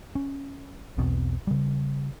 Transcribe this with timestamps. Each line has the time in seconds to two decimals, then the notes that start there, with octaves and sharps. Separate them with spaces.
0.15 C#4
0.98 B1 E2 B2 C4
1.47 C#3 G3